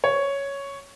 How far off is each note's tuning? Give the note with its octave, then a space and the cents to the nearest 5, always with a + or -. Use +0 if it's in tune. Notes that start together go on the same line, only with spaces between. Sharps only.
C#5 +5